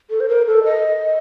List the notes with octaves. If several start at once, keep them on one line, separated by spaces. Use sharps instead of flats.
A4
C5
A#4
A4
D#5